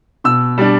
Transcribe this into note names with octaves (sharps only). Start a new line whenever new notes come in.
B2 E6
G3 D4